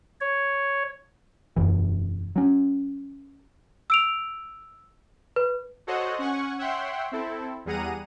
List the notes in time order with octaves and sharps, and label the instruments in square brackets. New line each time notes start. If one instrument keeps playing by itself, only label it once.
[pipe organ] C#5
[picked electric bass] E1 C#2 F#2 E3
F#3 C#4
[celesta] E6 D7 F7
B4
[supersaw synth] F#4 A4 C5 C#5 D#5 F#5
C#4 F#5 G#5 C#6
C#5 E5 F#5 G5 C6
C4 E4 A4
E2 G3 G#4 F#5 A#5 D#7